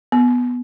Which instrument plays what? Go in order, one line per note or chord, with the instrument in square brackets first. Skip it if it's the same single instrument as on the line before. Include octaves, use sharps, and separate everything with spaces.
[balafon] B3